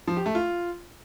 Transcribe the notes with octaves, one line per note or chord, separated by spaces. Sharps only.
F3
G4
A3
F4